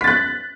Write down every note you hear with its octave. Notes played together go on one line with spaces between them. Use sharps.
F#6 A6 B6